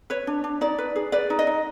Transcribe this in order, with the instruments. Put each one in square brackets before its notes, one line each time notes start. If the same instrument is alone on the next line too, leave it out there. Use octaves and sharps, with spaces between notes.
[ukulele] B4 C#5
D4
D4
D#4 D5
B4
G#4
B4 D5
D#4
D#5
D#4